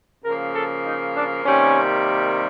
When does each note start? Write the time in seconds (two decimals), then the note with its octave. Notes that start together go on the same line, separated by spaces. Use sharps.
0.25 C#3 F3 A#3 A#4
0.55 A4
0.85 D#4
1.15 D4
1.44 C3 D#3 G3 A#3 C#4